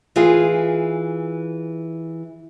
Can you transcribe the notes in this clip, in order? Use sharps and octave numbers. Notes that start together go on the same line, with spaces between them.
E3 F4 G#4